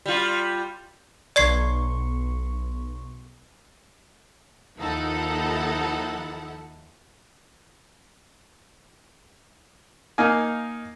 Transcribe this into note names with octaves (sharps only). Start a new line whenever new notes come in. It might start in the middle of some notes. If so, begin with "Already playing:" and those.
G3 F4
B1 D5 C6 C#6 G#6 C7
D#2 F3 D#4 E4 A4 F#5
A#3 D#4 F5 G#5